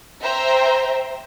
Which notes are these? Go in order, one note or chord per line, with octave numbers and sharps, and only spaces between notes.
C5 E5 G5 A#5